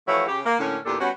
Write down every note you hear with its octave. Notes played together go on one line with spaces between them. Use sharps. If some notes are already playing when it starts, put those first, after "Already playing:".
E3 F3 A3 E4 F#4 C#5
C#3 G4
A#3
A2 D3 A#3 C#4
E2 A#2 A#3 D4 G4 A4
G3 B3 C#4 F#4